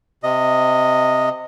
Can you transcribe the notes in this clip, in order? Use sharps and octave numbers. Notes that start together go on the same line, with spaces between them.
C3 D#5